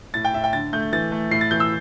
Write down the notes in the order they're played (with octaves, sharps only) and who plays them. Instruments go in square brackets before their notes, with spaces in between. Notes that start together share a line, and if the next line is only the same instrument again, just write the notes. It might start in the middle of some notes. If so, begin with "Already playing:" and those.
[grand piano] A2 A6
G5
A2 E5
G5
D3 A6
A3 G6
E3 A6
A3
A2 C7
A6
E3 G6
E6